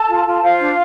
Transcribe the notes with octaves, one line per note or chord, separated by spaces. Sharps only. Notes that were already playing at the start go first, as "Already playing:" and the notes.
Already playing: A4 A5
F4
F4
F4 C5 F5
D4